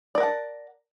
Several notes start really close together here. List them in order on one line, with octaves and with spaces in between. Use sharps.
D5 A#4 F#5 A5